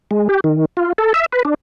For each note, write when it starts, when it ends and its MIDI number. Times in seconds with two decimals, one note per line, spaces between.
0.11 0.28 56
0.29 0.40 67
0.44 0.65 51
0.77 0.93 65
0.98 1.13 69
1.14 1.26 76
1.33 1.43 71
1.45 1.54 62